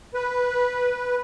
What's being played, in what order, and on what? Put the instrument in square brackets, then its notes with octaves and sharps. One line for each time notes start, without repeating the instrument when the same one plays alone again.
[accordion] B4